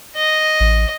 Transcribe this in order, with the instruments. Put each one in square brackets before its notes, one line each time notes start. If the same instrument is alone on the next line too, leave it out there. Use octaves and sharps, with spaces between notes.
[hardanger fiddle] D#5
[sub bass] A1